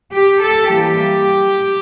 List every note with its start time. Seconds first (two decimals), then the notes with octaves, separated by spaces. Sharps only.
0.14 G4
0.41 A4
0.70 E3 G3 A#3 G4